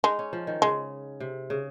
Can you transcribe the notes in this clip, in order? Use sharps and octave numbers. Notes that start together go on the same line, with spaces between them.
G#3 D#4
C#4
F3
D#3
C#3 G#3
C3
C#3